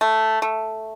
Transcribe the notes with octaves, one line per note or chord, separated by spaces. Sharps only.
A3
A3